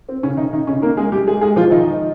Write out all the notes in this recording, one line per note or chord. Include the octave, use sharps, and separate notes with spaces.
C4
C#3 C#4
D#3 D#4
D#3 D#4
C#3 C#4
A#3 A#4
G#3 G#4
G3 G4
G#3 G#4
G#3 G#4
F3 F4
D#3 D#4